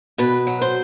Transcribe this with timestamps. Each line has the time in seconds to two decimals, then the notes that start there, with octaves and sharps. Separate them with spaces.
0.18 B2 B4
0.47 F#3
0.61 C5